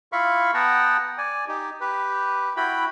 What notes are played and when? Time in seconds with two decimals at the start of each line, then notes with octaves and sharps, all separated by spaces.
0.12 E4 F4 F5 B5 C#6
0.54 B3 F#5 G5 A5 A#5
1.18 D5 G#5
1.48 D#4 G4
1.81 G4 B4
2.57 E4 F#4 G5 B5